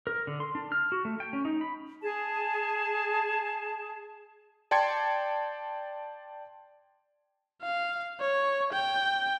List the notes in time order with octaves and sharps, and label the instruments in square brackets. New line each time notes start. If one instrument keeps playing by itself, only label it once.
[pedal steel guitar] A#4
D3
C6
D4
F6
F#4
A3
G5
C#4
D#4
B5
[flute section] G#4 A5
[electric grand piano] D5 G5 A5 C6 G#6 C#7
[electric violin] F5
C#5
G5